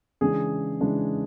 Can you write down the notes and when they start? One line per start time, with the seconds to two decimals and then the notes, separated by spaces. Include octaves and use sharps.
0.21 C#3 E3 G#3 D4 G#4
0.81 C#3 E3 G#3 D4